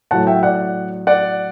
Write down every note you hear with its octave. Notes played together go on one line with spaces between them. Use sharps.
A2 F#3 A3 F#5 A5
E5 G5
D5 F#5
D5 F#5